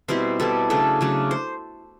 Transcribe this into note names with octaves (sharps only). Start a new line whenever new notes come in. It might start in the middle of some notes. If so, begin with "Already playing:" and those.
B2 G3 C4 E4 C5
B2 G3 C4 E4 A4
C#3 F#3 A3 D4 A4
C#3 F#3 A3 D4
C5